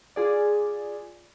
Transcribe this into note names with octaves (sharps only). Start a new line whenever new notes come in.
F4 G#4 D5